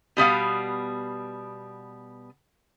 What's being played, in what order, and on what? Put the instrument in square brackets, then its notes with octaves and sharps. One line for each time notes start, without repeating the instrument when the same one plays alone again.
[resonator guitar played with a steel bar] B2 G3 B3 F5